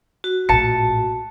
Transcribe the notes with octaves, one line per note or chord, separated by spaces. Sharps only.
F#4
A#1 A2 A5 C#7